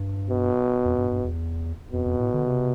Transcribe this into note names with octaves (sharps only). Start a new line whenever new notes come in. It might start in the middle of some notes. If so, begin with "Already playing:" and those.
Already playing: G2
B2
F2
G2
G2
E2
F2 B2
F2
A2
D3
C3